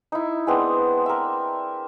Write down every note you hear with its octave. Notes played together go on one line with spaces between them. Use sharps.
D#4 E4
G#3 B3 C4 D4
A#4 E5